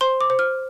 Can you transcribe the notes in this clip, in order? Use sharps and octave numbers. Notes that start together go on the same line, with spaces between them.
C5 C6
D6
C5
F6